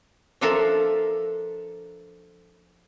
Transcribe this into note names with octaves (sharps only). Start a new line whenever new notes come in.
F3 D4 F4 A4 A#4 E5